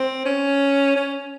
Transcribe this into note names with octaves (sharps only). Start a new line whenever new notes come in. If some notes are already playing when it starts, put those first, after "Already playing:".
Already playing: C4
C#4
C#4